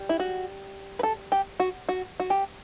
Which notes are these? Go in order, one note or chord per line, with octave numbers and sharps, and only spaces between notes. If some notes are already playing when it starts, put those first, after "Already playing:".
Already playing: G3
E4
F#4
B4
A4
G4
F#4
F#4
F#4
G4